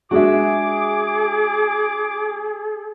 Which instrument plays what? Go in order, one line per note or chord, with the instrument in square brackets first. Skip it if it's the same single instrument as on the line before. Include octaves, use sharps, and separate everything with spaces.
[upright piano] G#3 D4 [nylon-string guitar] F#4 E5 [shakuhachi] G#4 [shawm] D6